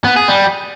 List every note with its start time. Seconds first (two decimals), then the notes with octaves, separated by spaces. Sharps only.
0.04 B3
0.16 G#4
0.28 G3